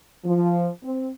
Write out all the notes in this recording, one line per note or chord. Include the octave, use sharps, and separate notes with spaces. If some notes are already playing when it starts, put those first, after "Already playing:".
F3
C4